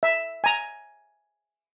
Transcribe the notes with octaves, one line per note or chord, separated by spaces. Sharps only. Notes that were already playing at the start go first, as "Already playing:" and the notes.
E5
G#5 A#5